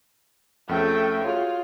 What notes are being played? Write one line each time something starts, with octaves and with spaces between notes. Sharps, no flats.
F2 A3 C#4 G#4 G5
F4 F#4 G#4 C#5